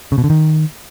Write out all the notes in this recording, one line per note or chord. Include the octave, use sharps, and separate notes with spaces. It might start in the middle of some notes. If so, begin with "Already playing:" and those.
C#3
B2
D3
D#3